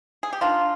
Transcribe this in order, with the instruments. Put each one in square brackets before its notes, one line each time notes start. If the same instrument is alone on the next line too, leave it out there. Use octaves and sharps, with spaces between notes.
[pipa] G#4
G4
D#3 D4 F4